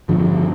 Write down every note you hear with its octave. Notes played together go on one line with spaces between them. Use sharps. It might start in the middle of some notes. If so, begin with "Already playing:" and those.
G2 D3 F3